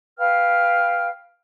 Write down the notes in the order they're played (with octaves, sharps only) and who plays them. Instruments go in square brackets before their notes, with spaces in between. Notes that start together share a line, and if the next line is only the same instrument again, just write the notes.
[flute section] B4 F5 G5 F6